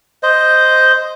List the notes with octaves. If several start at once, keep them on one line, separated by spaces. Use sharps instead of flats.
C5 D#5